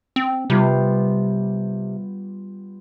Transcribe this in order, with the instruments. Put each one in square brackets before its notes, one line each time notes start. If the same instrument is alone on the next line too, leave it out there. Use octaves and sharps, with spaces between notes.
[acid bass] C4
[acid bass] C3 [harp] G3 B3 F4